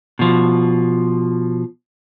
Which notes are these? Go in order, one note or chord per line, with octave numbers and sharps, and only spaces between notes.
B2 F3